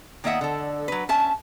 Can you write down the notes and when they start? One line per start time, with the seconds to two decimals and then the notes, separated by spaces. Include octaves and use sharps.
0.24 D#3 A#3 D#5 E5 F#5
0.41 D3 A4
0.88 F#3 B4
1.09 C#4 E5 A5